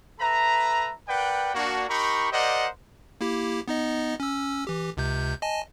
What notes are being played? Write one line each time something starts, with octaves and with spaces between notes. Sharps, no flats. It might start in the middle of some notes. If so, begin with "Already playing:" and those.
A4 B4 E5 A#5
A#4 B4 D5 F#5 G5
A#3 D4 F#4
D#4 G4 A#4 B5 C#6
G4 A#4 C5 D5 D#5 F#5
A#3 E4 G4
B3 D#4 D#5
C#4 E6
E3 G4
C#2 C3 G6
D#5 G#5 A5